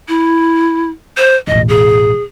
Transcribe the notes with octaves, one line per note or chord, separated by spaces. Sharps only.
E4
C5
E1 A1 D#5
G#4